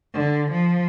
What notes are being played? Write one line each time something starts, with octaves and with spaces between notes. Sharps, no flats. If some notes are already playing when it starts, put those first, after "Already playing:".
D3
F3